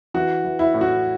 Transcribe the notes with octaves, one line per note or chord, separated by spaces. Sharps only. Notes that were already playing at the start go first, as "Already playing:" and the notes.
E3 F#4
E3
E4
A2
F#4